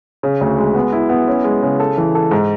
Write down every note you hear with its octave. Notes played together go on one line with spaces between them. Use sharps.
C#3
D2
G#3
B3
E4
B3
C#4
G#3
C#3
A4
E3
A4
G#2